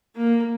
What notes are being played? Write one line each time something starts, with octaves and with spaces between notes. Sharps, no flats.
A#3